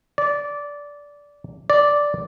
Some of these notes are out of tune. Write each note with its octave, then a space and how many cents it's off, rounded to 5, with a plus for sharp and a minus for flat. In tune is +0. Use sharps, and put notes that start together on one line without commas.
D5 -15
D5 -5